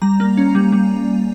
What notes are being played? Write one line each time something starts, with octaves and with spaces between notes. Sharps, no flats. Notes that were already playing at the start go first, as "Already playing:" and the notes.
G3 A#5
A#3
C#4
G3
G3